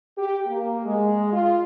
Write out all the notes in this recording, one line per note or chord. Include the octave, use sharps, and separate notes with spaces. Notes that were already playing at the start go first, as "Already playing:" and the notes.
G4
A#3
G#3
F4